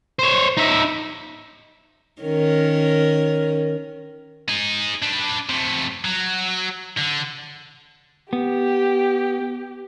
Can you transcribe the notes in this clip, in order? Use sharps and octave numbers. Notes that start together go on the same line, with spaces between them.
C5 C#5
D#4 E5
D#3 C#4 A#4
D#4 G#4
D4 B4
C3 A3
F#3
D3
B3 G4